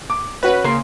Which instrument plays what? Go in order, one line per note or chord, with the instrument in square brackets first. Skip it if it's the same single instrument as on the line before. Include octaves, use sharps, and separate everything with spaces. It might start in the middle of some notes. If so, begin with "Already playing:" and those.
[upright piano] D6
[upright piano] C#4 F#4 [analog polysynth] B4
[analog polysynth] C#3 [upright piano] A#3 C6 C7